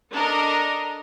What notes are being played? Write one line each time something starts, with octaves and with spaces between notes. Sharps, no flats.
D4 A4 A#4 D#5